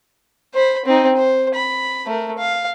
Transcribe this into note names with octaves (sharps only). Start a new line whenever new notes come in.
C5 B5
C4 D#4
C5
B5
A3 A#4
F5